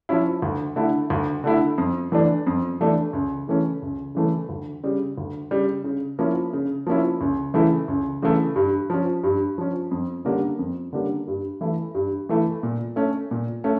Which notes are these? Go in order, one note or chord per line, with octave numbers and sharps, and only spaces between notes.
F3 C#4 E4
D2
D3 A3 E4
D2
D3 A3 E4
F2
E3 A3 D4
F2
E3 A3 D4
C#2
C#3 E3 A3 C#4
C#2
C#3 E3 A3 C#4
D2
C#3 G3
D2
C#3 G3
C#3
F3 A#3 C#4 E4
C#3
F3 A#3 C#4 E4
C#2
C#3 E3 A3 E4
C#2
C#3 E3 A3 E4
G2
F3 C#4
G2
F3 C#4
F2
D3 G3 A#3 C#4
F2
D3 G3 A#3 C#4
G2
E3 A3 E4
G2
E3 A3 E4
A#2
A3 C#4
A#2
A3 C#4